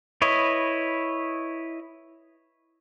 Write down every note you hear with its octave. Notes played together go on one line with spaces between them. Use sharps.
E4 B4 C#5 D#5